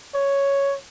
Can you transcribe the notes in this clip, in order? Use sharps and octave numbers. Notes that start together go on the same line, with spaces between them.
C#5